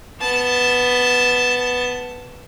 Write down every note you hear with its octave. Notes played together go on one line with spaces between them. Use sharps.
B3 A5